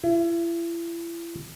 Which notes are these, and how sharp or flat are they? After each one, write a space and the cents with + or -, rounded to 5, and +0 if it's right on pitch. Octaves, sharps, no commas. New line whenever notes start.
E4 +35